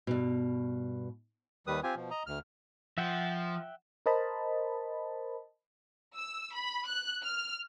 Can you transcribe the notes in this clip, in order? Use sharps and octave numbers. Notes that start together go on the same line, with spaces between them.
G2 B2
D#2 D#3 G3 B4 D#6
C4 F4 G4 G#5
B2 F3
D#5 A#5
D2 F6
F3 E5 F#5 G5
A#4 C5 D#5 A5 B5
E6
B5
F#6
F6